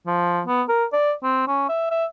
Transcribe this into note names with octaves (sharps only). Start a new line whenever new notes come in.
F3
B3
A#4
D5
C4
C#4
E5
E5